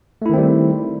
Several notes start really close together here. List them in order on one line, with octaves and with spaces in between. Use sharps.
A3 E4 D#3 C4 G3